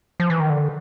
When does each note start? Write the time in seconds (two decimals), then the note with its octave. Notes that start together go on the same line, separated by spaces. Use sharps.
0.20 F3
0.30 E3
0.40 D#3
0.50 D3